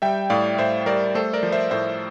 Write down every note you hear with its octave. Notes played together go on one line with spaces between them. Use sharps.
G3 E5 G5
A2 D5 F5
A2 C5 E5
G3 A#4 D5
A3 A4 C5
A#4 D5
F3
C5 E5
A2 C5 E5